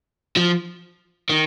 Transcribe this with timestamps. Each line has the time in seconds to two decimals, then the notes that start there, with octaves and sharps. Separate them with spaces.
0.36 F3
1.29 D#3